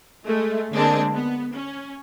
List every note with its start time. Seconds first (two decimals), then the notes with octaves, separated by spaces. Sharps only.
0.24 G#3 A3
0.73 D3 G#3 A#3 C4 D4
1.14 B3
1.54 C#4